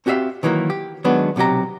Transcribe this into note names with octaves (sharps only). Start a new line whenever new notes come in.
C4 F#4 G4 D5 E5 F5
D#3 E3 F#3 A3 A#3
G4
D#3 F#3 G#3 B3 D4
B1 C3 F#3 G4 A#5